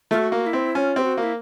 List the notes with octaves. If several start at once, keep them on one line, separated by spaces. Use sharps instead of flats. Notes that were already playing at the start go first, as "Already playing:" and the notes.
A3 F4
F#4
A#3
E4
C4
C#4 F4
C4 G4
F#4
A#3
E4